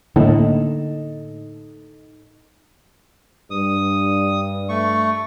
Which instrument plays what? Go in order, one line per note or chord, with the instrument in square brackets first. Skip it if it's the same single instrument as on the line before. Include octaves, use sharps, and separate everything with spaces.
[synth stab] A2 [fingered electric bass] D3 A#3 [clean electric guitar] D#4 A4 D#5
[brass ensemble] G2 [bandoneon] D#6
[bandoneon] A3 C#6